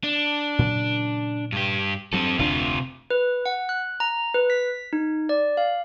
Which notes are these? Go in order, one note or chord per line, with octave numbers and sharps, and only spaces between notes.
D4
A#2 C#3 F#3
G2 G4
G2 F#3 C4 A4
F1 D2 C3 D4 F4
B4
F#5
F#6
A#5
B4
B6
D#4
D5
F5